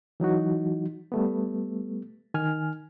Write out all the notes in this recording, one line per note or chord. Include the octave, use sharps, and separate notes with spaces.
E3 F#3 D#4 F#4
G3 A3 B3
D#3 G#5 F6